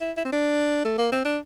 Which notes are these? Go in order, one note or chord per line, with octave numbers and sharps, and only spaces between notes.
E4
E4
C4
D4
A3
A#3
C4
D4